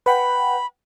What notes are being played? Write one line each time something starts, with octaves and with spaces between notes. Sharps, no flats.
B4 F#5 G5 B5